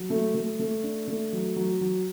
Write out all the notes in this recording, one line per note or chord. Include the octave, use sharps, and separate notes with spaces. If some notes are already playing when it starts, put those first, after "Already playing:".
Already playing: F#3
A3
A3
A3
D4
A3
F#3
F#3
F#3